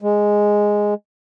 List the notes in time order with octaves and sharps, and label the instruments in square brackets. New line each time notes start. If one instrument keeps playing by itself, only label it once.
[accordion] G#3